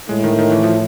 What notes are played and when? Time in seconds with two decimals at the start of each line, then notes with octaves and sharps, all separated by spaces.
0.09 A2 G#3
0.24 D#3
0.38 D#3
0.52 E3
0.63 F3